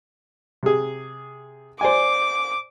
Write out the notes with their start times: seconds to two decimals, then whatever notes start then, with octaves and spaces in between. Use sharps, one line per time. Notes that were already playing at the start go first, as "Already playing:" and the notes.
0.63 C3 G#4
1.81 C5 D5 G#5 D6